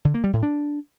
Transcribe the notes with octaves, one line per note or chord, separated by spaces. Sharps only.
D3
A#3
G3
A2
D4